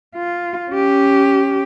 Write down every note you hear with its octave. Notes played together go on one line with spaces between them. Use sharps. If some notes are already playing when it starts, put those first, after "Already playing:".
F4
C#4 G4